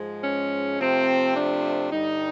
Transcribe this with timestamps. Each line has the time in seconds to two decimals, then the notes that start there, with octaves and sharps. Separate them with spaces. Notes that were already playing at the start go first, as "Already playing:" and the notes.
Already playing: G#2 F3 G#3
0.23 C#4
0.79 C3 F3 A3 C4
1.35 D4
1.91 G2 D3 G3 D#4